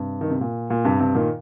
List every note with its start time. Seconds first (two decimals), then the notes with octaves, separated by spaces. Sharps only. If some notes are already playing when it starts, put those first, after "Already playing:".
Already playing: G2 C3
0.21 D#3
0.30 C3
0.41 A#2
0.70 A#2
0.85 G2 C3
0.99 G2 C3
1.14 A#2 D#3